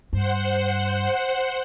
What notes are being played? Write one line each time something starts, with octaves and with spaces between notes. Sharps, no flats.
G2 C5 F#5